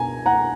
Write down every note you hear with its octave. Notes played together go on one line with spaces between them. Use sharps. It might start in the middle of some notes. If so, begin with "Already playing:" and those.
Already playing: B2 G#5 A#5
F#5 A#5